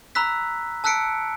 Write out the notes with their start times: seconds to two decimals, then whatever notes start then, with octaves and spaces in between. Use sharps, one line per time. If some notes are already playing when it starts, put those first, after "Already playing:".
0.15 A#5 B5 E6 F#6 B6
0.84 A5 E6 F#6 B6 C#7 D7